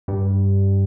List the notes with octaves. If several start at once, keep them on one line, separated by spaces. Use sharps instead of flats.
G2